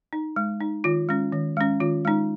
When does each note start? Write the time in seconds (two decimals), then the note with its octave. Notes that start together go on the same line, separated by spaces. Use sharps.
0.13 D#4
0.36 G#3
0.60 D#4
0.84 D#3 F4
1.09 G#3 C#4
1.32 D#3
1.57 G#3 C#4
1.80 D#3 F4
2.05 G#3 D#4